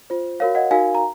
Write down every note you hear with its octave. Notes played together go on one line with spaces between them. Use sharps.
F4 C5
F#4 A#4 C#5 F5
D#5 F#5
D#4 F#4 A#4 F5 G#5
A#5